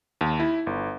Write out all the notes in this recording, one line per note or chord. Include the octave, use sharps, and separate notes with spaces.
D#2
E4
G1